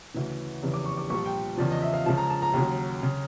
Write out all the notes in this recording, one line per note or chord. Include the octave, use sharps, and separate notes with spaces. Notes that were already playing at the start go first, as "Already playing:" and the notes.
D2 C#3 E3
F1 E2 C#3 E3
D6
C#6
D6
C2 A#2 F3 C#6
G5
E2 C#3 F3 D5
D#5
E5
F5
C#2 C#3 F3 A5
A#5
A5
A#5
D#2 C#3 F#3
C#3